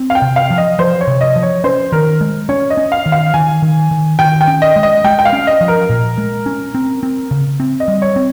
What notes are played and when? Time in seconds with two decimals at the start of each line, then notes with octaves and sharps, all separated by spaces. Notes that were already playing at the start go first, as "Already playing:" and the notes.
Already playing: C4
0.10 F5
0.15 G5
0.22 C3
0.36 F5
0.50 F3
0.58 D#5
0.79 F3 C5
1.01 C#5
1.07 C3
1.21 D#5
1.36 F3
1.43 C#5
1.64 C#4 C5
1.92 D#3 A#4
2.21 G#3
2.49 C#4 C#5
2.70 D#5
2.77 C#4
2.92 F5
3.06 D#3
3.12 F5
3.34 D#3 G#5
3.62 D#3
3.91 D#3
4.19 D#3 G5
4.41 G5
4.47 C#4
4.62 D#5
4.76 G#3
4.83 D#5
5.04 G#3 G5
5.19 G5
5.25 F5
5.33 C#4
5.47 D#5
5.61 F3
5.68 A#4
5.89 A#2
6.18 G#3
6.46 C#4
6.75 C4
7.03 C4
7.31 C#3
7.60 C4
7.80 D#5
7.88 G3
8.02 C#5
8.16 C4